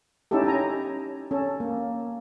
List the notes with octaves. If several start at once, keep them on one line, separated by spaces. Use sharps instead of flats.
C#4 D#4 E4 G4 A4
C#4 G#5 A#5
C#4 A4
A#3